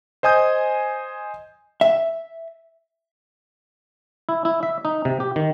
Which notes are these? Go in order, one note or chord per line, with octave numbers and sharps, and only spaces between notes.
C5 D#5 G#5 D#6 G6
E5
E4
E4
E5
D#4
C3
G4
D#3